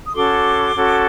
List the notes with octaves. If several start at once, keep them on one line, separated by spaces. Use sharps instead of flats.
D#6
C#4 F#4 A4 C6 D6
C#4 F#4 A4